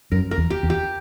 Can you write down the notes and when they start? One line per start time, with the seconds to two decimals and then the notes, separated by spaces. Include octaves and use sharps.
0.12 F#2 A#4
0.31 A#4
0.38 E2
0.50 G4
0.63 E2
0.70 G4